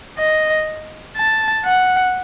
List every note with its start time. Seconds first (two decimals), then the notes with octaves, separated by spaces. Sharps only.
0.19 D#5
1.17 A5
1.65 F#5